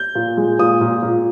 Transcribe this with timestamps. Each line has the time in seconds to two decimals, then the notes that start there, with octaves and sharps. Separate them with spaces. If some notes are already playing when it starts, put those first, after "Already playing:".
Already playing: G6
0.15 A#2
0.37 G#3
0.59 A#2 D#6
0.81 A#2
1.03 A#2